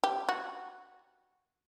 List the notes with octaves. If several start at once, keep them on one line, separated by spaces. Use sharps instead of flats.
G4
F#4